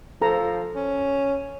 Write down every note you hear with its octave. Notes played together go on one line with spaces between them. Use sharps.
F3 A4 A#5
C#4